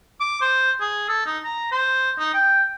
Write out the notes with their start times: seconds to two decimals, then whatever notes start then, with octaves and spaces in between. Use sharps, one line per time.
0.20 D6
0.41 C5
0.80 G#4
1.08 A4
1.26 D#4
1.44 A#5
1.72 C5
2.18 D#4
2.34 G5